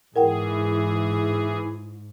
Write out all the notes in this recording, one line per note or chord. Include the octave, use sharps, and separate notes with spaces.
G#2 E3 E4 G#4 A#4 F#5 G5